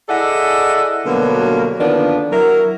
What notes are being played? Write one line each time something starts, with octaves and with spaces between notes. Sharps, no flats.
E4 G#4 A4 D5 D#5 F#5
B2 D3 F#3 G3 A#3 B3
D3 D#3 F3 A#3 B3 D4
F#3 E4 A#4